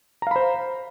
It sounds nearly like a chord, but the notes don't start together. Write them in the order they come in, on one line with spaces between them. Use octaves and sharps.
A#5 F5 B5 C5